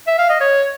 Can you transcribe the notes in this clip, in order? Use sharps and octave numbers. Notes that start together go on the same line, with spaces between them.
E5
F5
D#5
C#5